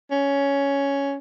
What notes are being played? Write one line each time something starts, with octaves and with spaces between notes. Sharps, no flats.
C#4